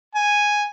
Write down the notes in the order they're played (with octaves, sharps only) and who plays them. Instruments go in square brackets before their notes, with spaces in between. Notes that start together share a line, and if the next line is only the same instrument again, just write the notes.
[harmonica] G#5